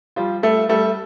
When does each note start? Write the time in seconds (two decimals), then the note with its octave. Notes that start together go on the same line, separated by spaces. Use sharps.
0.16 F3 G3 F4
0.43 G3 A3 A4
0.69 G3 A3 A4